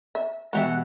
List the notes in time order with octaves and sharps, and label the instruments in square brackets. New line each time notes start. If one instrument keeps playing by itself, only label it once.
[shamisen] E5
[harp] B2 E3 G#3 [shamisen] F#4 G4 E5 [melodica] F#5